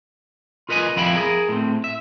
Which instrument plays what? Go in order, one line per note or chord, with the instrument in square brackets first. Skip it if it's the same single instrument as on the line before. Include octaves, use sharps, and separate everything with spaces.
[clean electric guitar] F4 A#4 B4 D#5 F#5 G#5
F2 F3 E4 F5 G5 B5
G#4 A#4
A2 C4
E5